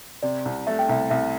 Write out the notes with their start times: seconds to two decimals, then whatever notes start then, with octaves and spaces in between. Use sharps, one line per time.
0.23 C3 D5
0.45 C2
0.67 A3 E5
0.79 G5
0.89 C2 E5
1.10 C2 E5